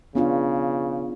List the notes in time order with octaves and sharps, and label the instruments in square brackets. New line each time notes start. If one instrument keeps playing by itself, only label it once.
[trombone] C#3 [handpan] B3 D4 F4